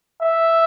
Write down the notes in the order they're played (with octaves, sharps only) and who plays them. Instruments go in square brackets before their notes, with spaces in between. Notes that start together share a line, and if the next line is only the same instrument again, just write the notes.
[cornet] E5